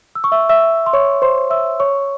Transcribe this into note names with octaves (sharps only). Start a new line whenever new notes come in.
E6
C#6
E5 E6
E5 E6
C6
C#5 C#6
C5 C6
E5 E6
C#5 C#6